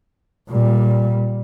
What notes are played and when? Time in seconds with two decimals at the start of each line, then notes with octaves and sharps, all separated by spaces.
0.49 A#2 G3